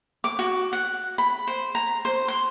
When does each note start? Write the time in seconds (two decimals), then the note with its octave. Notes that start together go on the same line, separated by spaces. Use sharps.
0.24 D6
0.39 F#4
0.73 F#5
1.18 B5
1.47 C5
1.75 A#5
2.05 C5
2.28 C6